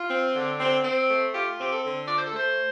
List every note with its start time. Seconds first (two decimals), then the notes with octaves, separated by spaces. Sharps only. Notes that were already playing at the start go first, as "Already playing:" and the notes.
Already playing: F4
0.10 C4
0.35 D3
0.59 C4
0.84 C4
1.08 A3
1.33 F4 G4
1.58 C4 G4
1.70 A4
1.83 D3
2.07 F4 D5
2.17 C5
2.26 A4
2.33 A3 C5